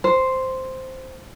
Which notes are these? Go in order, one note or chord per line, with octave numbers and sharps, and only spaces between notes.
C5